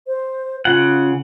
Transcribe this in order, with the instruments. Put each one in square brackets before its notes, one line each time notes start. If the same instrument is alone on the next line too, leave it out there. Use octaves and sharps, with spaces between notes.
[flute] C5
[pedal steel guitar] C#3 F#5 [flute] F4